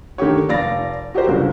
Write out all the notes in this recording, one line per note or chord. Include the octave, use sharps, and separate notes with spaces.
D3 D#3 A3 G4 C#5
F1 D5 F5 A6 A#6
F#4 G4 A#4 C5
G1 C#2 D3